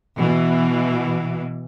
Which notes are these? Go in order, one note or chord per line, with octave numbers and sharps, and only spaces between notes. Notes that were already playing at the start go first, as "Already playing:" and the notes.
B2 E3